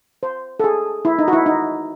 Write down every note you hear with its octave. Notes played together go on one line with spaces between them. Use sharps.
C5
A4
G#4
E4
D#4
F#4
E4
D#4